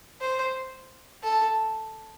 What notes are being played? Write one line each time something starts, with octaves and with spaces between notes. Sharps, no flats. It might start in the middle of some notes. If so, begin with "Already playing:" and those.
C5
A4